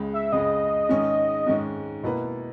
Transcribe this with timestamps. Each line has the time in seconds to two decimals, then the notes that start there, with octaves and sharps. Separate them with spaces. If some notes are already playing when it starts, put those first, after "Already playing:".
Already playing: C#2 C#3 G#3
0.13 E5
0.32 C#2 C#3 G#3 D#5
0.89 G#2 D#3 G#3 C#4
1.47 G#2 D#3 G#3 C#4
2.03 B2 A#3 E4 B4